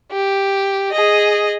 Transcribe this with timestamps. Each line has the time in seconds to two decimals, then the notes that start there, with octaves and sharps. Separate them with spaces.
0.12 G4
0.92 G#4 D#5